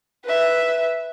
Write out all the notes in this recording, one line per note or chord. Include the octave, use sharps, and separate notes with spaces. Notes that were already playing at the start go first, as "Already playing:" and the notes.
B4 E5